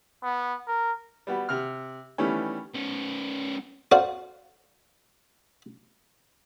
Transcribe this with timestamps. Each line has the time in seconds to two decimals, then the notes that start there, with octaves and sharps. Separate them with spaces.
0.23 B3
0.67 A#4
1.27 G3 B3 F#4
1.49 C3 F6
2.18 D#3 E3 G3 A3 B3 C#4
2.75 B3 C#4
3.92 F#4 A4 C5 D5 F5 F#5